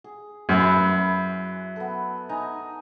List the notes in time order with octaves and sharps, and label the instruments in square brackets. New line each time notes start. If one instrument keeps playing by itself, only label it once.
[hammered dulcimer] G#4
[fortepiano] F#2 [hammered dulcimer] E4 B4
[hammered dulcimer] B3 A4
D#4 G#5 A#5